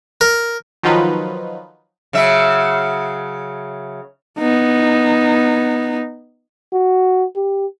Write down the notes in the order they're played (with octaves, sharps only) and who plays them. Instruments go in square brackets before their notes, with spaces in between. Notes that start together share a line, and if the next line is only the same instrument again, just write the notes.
[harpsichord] A#4
[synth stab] D#3 F3 F#3 D#4 F4 B4
[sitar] C#3 F#3 E5
[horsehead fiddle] B3 D#4
[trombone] F#4
G4